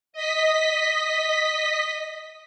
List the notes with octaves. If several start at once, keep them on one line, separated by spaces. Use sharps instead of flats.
D#5 B6